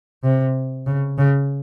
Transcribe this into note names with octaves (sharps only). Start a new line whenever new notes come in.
C3
C#3
C#3